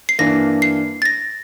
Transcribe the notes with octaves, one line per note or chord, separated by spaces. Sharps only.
C7
G2 E3 A#3 D4 A#6
C7
A6
A#6